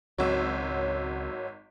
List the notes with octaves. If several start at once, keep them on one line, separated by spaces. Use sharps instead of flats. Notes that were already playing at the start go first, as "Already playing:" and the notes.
G#1 C#2 F#3 C4 C#5 F#5 E6